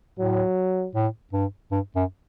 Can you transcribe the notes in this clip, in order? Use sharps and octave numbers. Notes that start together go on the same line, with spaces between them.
A2 F#3
A2
G2
G2
F#2